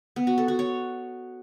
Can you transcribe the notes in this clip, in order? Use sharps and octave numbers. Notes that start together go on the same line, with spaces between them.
B3
F#4
A4
F#4
C#5